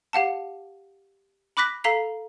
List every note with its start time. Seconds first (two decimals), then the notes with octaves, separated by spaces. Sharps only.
0.13 G4 F5 F#5 A5
1.57 B5 D6 F#6 A#6 B6
1.84 A4 F5 A#5 B6 C7